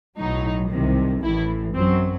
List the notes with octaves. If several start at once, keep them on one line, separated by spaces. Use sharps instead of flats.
B1 A2 F#3 D#4
C2 C3 D#3
A1 A2 E3 E4
F#2 F#3 C4